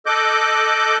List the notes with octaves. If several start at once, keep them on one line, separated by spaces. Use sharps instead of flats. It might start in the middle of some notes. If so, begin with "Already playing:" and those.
A4 D#5 D6 F#6 G6